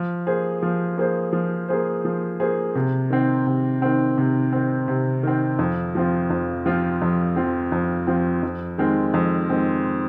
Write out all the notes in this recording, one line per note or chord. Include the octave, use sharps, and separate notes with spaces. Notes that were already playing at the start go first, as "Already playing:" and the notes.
Already playing: F3
A#3 G#4 C5
F3
A#3 G#4 C5
F3
A#3 G#4 C5
F3
A#3 G#4 C5
C3
D#3 C4
C3
D#3 C4
C3
D#3 C4
C3
D#3 C4
F2
F3 C4 F4
F2
F3 C4 F4
F2
F3 C4 F4
F2
F3 C4 F4
F2
D#3 G#3 C4
F2
D#3 G#3 C4